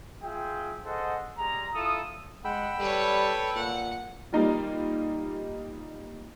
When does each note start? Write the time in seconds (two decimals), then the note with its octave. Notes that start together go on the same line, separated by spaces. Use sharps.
0.23 F4 G#4 E5 G5
0.85 G#4 A4 C5 D#5 F#5
1.37 G3 G#3 A#5
1.74 E4 F4 A4 D#6
2.45 G#3 F#5 G5 B5 E6
2.79 G3 A4 B4 C#5
3.55 A#2 F#5
4.33 G3 A#3 D#4 F4